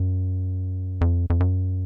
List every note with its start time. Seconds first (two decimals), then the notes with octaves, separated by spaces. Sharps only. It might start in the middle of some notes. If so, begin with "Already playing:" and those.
Already playing: F#2
1.01 F2
1.30 F2
1.40 F#2